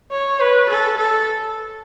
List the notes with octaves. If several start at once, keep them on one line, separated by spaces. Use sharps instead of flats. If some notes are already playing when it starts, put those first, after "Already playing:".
C#5
B4
A4
A4